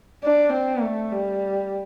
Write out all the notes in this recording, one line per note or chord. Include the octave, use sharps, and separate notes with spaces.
D4
C4
A3
G3